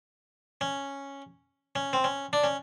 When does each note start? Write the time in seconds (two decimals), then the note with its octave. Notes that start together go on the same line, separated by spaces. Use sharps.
0.61 C#4
1.76 C#4
1.93 C4
2.04 C#4
2.33 D4
2.44 C#4